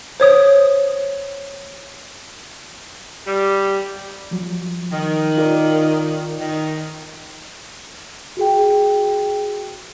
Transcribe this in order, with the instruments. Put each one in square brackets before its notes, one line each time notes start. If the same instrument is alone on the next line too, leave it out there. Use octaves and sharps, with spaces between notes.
[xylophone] C5 C#5 D#6
[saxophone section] G3
[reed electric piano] F3 F#3
[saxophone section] D#3
[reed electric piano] F4 A#4 D5
[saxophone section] D#3
[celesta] F#4 G#4 G5